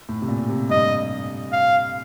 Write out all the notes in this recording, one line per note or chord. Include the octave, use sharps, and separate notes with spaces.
A2
C3
A#2
C3
G2 D#5
F5